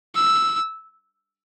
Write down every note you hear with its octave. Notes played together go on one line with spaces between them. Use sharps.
E6